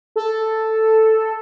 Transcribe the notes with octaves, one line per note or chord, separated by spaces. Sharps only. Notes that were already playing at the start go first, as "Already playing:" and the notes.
A4